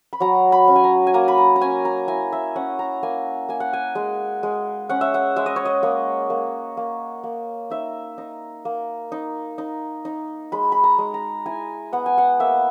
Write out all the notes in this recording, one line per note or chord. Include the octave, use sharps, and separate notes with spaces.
B5
F#3 A#5
B5
C#4
G#5
A#5
G#5
A#3 A#5
B5
A#5
A#5
C#4 G#5
A#5
E4 G#5
E5
C#4 F#5
A#5
A#3 G#5
A#3 G#5
F#5
G#5
G#3
G#3
C#4 F#5
E5
F#5
G#3 E5
D#5
C#5
D#5
A#3 C#5
A#3
A#3
A#3
D#4 E5
D#4
A#3
D#4
D#4
D#4
G#3 B5
B5
A#5
G#3
A#5
E4 G#5
B3 F#5
G#5
F#5
A#3 E5